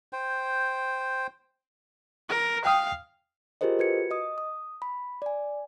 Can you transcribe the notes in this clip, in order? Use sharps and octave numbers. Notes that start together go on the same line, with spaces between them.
C5 G5
A#4
F5 G5 D#6
F4 G4 G#4 A#4 C5 D#5
F#4 B4 G#6 C#7
D#5 D#6
D#6
B5
D5 G#5